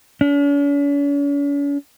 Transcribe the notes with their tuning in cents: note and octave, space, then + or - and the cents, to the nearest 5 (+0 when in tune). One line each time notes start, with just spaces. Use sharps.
C#4 +45